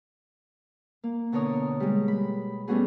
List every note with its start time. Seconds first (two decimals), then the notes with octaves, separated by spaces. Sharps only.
1.04 A#3
1.32 B2 D3 A#4 C#5 D#6
1.80 G3 G#3
2.08 B5
2.68 G3 A3 B3 C#4 F#4 G#4